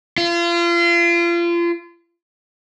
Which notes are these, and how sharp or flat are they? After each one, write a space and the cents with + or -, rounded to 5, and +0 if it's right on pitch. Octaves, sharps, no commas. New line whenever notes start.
F4 -35